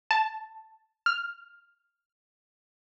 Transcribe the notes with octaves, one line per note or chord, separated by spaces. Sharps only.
A5
F6